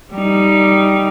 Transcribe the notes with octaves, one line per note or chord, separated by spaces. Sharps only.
G3 D#4